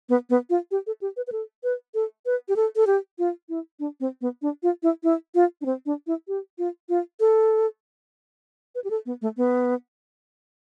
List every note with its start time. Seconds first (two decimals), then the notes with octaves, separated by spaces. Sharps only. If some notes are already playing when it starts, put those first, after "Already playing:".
0.09 B3
0.30 B3
0.50 F4
0.71 G4
0.87 A4
1.01 G4
1.17 B4
1.27 B4
1.32 A4
1.64 B4
1.94 A4
2.26 B4
2.49 G4
2.56 A4
2.76 A4
2.87 G4
3.19 F4
3.49 E4
3.80 D4
4.00 C4
4.21 B3
4.42 D4
4.63 F4
4.83 E4
5.03 E4
5.35 F4
5.61 D4
5.66 C4
5.86 D4
6.07 E4
6.28 G4
6.58 F4
6.89 F4
7.20 A4
8.75 B4
8.84 G4
8.90 A4
9.06 B3
9.22 A3
9.37 B3